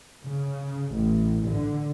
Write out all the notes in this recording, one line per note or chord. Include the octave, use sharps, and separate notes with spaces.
C#3
A1
D3